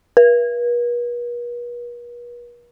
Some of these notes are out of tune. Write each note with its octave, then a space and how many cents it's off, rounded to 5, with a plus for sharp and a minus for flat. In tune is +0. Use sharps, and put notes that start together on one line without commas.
B4 -45